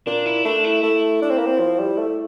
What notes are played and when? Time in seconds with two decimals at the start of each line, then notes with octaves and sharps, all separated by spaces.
0.07 A#2 D4
0.26 E4
0.45 A3 D4
0.64 E4
0.83 A3
1.22 D4
1.30 C4
1.39 A#3
1.47 C4
1.60 F3
1.79 G3
1.98 A3